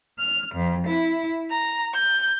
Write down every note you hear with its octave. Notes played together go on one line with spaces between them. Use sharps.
F6
F2
E4
A#5
G6